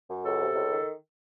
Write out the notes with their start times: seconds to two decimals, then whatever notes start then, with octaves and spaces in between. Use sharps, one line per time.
0.09 F#2
0.24 C#2 A4
0.40 C3
0.55 C#2
0.71 D#3